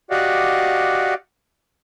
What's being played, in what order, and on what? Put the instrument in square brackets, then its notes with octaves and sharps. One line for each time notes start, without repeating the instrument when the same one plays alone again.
[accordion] F#4 G4 D5 D#5 F5 F#5